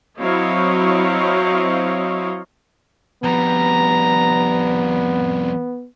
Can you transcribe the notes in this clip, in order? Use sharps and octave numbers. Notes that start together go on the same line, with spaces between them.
F#3 C4 E4 C#5 D#5 F5
F2 G3 B3 A#5